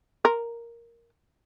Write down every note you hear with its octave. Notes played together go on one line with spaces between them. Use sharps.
A#4